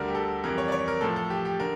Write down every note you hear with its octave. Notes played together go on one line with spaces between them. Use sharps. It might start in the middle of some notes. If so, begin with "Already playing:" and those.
Already playing: D2 D3 G3 A#4
G4
A4
F2 E3 G3 A#4
C#5
D5
C#5
A#4
A2 F3 A4
A4
G4
G4
D3 A#4